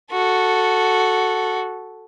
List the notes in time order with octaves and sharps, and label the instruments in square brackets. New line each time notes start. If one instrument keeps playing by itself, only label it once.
[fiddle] F#4 A4